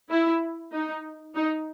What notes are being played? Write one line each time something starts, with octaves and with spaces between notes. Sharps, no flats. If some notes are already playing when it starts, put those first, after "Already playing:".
E4
D#4
D#4